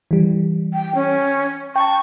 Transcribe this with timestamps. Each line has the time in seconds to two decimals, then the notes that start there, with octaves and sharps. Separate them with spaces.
0.11 E3 G3
0.74 G5
0.95 C#4
1.76 G5 A5 C#6